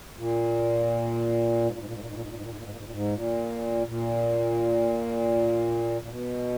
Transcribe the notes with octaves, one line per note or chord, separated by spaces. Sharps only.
A#2
G#2
A#2
G#2
A#2
G#2
A#2
G#2
A#2
G#2
A#2
G#2
A#2
G#2
A#2
G#2
A#2
G#2
A#2
G#2
A#2
A#2
A#2
B2